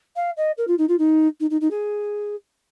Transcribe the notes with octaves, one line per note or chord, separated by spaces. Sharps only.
F5
D#5
A#4
F4
D#4
F4
D#4
D#4
D#4
D#4
G#4